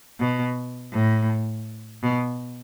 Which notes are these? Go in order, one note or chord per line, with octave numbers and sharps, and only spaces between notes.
B2
A2
B2